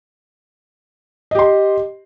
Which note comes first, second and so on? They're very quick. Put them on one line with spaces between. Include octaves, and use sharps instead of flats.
D#5 G4 C6